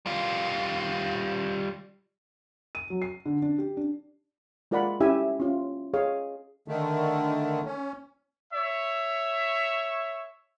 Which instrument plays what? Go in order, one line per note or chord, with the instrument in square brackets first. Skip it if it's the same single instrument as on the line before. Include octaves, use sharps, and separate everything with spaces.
[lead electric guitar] G3 F4
[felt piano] D#7
F#3
C7
D3
D4
G4
D4
[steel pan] G#3 F4 A#4 D5 F#5 B5
C#4 E4 G4 E5 G#5
C#4 F4
G#4 C#5 F5
[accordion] D3 D#3 A3
C#4
[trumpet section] C#5 E5